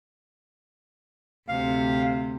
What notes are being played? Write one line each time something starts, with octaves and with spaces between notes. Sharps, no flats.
D2 C3 F5